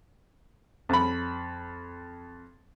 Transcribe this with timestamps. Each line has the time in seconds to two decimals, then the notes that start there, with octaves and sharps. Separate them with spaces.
0.89 F2 B5